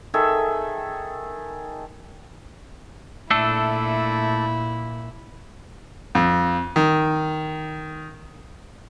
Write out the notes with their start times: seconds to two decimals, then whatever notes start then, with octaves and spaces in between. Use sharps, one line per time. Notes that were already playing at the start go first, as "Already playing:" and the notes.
0.14 D#3 G#4 A4 E5
3.31 A#2 A3 D4 E4 A4
6.15 F2
6.76 D#3